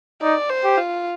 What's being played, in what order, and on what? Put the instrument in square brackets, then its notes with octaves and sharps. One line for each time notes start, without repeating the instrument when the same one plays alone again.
[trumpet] D#4 [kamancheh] D5
[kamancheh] C5
[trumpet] G4
[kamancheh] F4